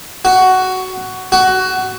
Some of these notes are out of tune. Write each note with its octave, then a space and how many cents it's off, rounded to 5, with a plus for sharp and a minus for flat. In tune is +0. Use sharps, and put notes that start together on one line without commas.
F#4 +10
F#4 +15